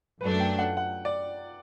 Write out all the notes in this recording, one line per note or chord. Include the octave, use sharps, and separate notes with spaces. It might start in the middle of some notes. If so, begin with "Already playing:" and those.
F#2 F#3 A3 D4 B4
G5
F#5
F#5
D5